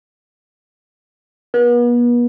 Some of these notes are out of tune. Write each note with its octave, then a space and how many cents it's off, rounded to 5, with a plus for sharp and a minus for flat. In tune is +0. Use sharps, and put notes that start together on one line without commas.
B3 -40